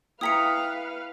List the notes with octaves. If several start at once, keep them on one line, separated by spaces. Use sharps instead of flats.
E4 B4 F5 G5 A#5 D#6 B6 C#7